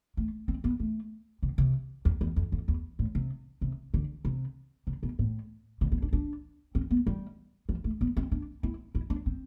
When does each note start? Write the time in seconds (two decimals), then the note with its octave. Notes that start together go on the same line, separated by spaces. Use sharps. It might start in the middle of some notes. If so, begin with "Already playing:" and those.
0.17 A3
0.48 C4
0.64 B3
0.80 A3
1.43 C3
1.58 C3
2.05 E2
2.21 E2
2.36 F2
2.52 F2
2.68 E2
2.99 A2
3.15 C3
3.61 C3
3.94 D3
4.25 C3
4.87 C3
5.03 B2
5.19 A2
5.81 C3
5.92 B3
6.02 D4
6.13 D4
6.75 C4
6.91 B3
7.07 G3
7.69 F3
7.84 A3
8.01 B3
8.17 C4
8.32 D4
8.63 E4
8.95 E4
9.10 D4
9.26 C4